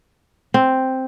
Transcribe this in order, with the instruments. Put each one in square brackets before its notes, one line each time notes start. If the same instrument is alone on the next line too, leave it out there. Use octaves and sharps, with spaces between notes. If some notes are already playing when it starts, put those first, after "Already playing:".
[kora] C4